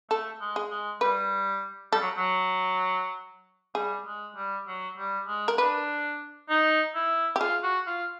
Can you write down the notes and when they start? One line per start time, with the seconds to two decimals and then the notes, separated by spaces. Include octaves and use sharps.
0.10 A3 A4
0.41 G#3
0.56 G#4
0.70 G#3
1.01 G3 B4
1.93 G3 A4
2.01 F#3
2.17 F#3
3.75 G3 G#4
4.06 G#3
4.36 G3
4.67 F#3
4.98 G3
5.28 G#3
5.48 A#4
5.58 D4 B4
6.49 D#4
6.95 E4
7.36 G4
7.40 F4 G#4
7.63 F#4
7.87 F4